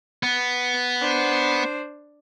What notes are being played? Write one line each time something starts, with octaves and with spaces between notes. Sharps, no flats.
B3
D4 C5